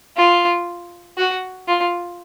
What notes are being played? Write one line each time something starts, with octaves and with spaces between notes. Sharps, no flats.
F4
F#4
F4